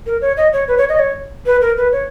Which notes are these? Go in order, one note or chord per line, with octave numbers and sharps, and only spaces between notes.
A#4
C#5
D#5
C#5
B4
C#5
D#5
C#5
B4
A#4
B4
C#5